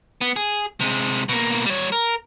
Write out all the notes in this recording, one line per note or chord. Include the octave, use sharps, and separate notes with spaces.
B3
G#4
C3 G#3
B2 A#3
G3 C#5
A#4